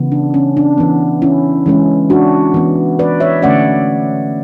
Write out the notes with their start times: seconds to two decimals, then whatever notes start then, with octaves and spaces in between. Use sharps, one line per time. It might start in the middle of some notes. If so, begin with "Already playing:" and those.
Already playing: C#3 E3 B3
0.12 D4
0.34 C#4
0.57 D4
0.78 E3 B3
1.22 C#4 E4
1.66 E3 G#3 C#4
2.10 D4 F#4
2.54 E3 B3
2.99 B4 D5
3.20 C#5 E5
3.42 D3 A3 C#4 D5 F#5